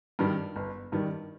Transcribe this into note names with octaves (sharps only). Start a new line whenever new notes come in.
G2 D#3 G3
G1
G2 D#3 G3